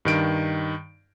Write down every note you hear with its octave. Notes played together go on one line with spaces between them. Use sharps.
G2 D#3 D7